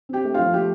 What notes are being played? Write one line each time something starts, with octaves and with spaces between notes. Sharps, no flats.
C4 G4 G5
A3
F3 F4 F5
A3 G4 G5